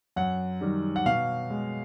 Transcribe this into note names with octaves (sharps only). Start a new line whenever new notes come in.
F#2 F#5
D#3 G3
F#5
B2 F5
G#3